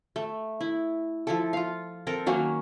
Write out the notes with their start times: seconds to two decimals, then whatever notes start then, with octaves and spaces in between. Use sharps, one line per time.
0.16 A3
0.61 E4
1.27 F3 E4 A4
1.53 F4 F5
2.07 C4 A4 A#4
2.26 D#3 F#3 A#3 C#4